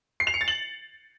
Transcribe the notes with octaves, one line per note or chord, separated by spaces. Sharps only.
C7
F7
C#7
A6
F#7